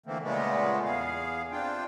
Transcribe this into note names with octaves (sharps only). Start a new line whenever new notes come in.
D3 E3 A3 A#3 C4
A#2 C#3 G#3 A3 B3
E2 B3 G#4 F5
C3 D4 F4 G5